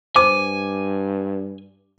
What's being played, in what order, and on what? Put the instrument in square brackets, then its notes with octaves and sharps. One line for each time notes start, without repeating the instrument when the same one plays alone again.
[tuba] G2 [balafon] C5 [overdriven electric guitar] G#5 [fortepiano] D6